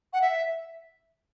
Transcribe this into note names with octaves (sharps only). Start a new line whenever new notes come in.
F#5
E5